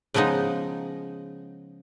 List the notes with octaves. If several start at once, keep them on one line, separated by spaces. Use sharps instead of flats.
C#3 F3 G#3 B3 D#4